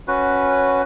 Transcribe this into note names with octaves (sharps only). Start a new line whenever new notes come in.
C#4 F#4 B4